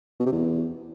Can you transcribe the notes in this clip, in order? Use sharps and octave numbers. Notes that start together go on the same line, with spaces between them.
B2
C3
E2